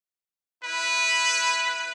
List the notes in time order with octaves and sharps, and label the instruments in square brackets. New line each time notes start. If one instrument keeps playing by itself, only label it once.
[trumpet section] E4 B4